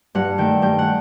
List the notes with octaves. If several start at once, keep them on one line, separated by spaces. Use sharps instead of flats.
G2 F#5
D#3 A3 G5
G2 G5
F#5